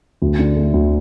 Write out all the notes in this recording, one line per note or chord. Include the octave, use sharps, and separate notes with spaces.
D2
D3
A3
D2